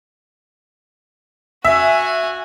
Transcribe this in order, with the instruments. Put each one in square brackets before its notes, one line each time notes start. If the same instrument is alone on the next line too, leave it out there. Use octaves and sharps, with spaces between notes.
[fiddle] F#4 G#5 [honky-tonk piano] E5